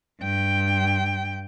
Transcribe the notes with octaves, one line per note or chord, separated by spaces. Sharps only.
G2 G5